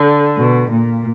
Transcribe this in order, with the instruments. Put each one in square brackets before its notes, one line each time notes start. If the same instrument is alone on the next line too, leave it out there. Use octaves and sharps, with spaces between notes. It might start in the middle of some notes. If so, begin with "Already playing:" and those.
Already playing: [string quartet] D3
B2
A#2